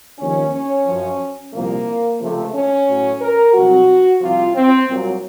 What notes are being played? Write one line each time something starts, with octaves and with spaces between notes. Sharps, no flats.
D#2 C#3 F3 C#4
C#4
F#2 F3
C2 A#2 F3 A#3
C#2 C3 F3 A3
C#4
A2 F#3
A#4
C2 C3 F#3 F#4
C2 C3 F3 F4
C4
C2 A#2 F#3